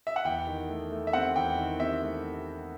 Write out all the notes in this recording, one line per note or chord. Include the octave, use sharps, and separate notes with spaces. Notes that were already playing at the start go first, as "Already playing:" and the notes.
E5
F#5
E2 G5
D#3
A3
A3
E5
C4 F#5
E2 G5
D#3
C4 E5
A3